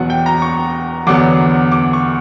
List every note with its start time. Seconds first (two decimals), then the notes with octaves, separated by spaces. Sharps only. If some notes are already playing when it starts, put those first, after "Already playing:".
Already playing: E2 B2 F#3 F#5
0.10 G5
0.26 A#5
0.42 C#6
1.07 E2 D3 F#3 B3 D6
1.72 D6
1.93 C#6